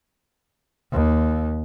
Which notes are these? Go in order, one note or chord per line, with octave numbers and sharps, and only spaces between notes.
D#2